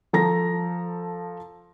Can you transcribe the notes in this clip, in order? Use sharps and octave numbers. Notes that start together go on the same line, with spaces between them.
F3 A4 A#5 A#6